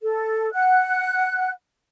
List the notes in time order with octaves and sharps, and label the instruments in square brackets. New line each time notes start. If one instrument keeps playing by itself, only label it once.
[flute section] A4
F#5 F#6